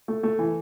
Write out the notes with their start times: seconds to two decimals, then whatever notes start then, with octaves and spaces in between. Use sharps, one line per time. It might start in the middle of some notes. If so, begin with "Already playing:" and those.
0.08 A3
0.23 A3
0.39 E3